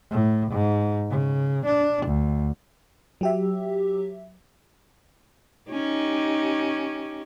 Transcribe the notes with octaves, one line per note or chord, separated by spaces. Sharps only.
A2
G#2
C#3
D4
D2
F#3 G4 E5
C#4 D#4 G4